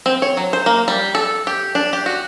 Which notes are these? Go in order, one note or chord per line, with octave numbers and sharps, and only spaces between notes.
C4
C#5
F#3
C5
A#3
G3
A4
G4
D4
G4
F#4